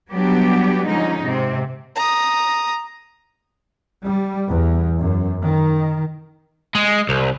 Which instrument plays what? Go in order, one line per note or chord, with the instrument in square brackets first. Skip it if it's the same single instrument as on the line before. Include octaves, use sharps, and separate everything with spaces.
[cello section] F#3 G3 B3 D4 G4
D3 F3 G#3 C#4 D#4
G#2 C3 C4
[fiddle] A#5 D#6
[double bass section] G3
E2
F#2
D#3
[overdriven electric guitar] G#3
C2